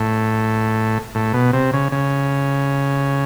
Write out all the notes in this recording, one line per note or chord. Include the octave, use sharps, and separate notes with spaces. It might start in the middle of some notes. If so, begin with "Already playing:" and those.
Already playing: A2
A2
B2
C3
C#3
C#3